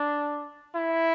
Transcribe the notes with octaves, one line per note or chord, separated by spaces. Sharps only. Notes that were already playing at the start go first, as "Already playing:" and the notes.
Already playing: D4
E4